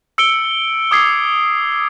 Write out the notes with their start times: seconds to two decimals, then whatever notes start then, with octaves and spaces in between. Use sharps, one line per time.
0.18 E6 C#7 D7 G7
0.91 D6 D#6 G#6 C7